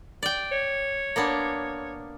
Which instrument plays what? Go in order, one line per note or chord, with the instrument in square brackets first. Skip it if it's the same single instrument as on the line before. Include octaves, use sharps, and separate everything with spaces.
[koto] D5 G5
[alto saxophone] C#5
[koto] A#3 B3 D4